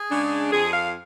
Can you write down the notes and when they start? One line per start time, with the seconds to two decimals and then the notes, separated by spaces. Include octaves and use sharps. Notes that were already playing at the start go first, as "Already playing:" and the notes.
Already playing: G#4
0.11 C#3 G#3 D4
0.52 F2 G#4
0.73 F5